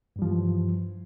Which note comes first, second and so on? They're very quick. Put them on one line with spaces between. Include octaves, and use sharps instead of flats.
G2 G3 F3 E3